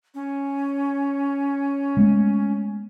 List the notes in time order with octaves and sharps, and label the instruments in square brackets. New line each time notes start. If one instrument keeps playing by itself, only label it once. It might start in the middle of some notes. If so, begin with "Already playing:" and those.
[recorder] C#4
[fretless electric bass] G#3 A3 B3